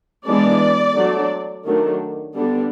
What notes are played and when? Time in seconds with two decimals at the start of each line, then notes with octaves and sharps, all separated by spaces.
0.27 E3 G#3 B3 D4 D5
0.96 F#3 A3 D4
1.66 D#3 F#3 A3 D4
2.35 D3 G3 B3 D4